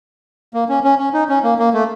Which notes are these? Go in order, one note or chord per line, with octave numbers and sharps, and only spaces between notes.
A#3
C#4
C#4
C#4
D#4
C#4
A#3
A#3
A3